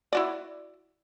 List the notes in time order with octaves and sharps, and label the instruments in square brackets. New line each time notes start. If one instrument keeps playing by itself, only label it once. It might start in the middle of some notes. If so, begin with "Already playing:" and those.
[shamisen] E4 F#4 D5